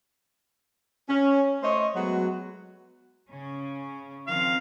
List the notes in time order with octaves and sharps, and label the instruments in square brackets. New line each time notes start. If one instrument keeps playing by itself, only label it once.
[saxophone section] C#4
A3 C5 C#5 D#5
F#3 G#3 A3 B3 F#4
[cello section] C#3 C#4
[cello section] D#3 F3 C4 [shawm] F5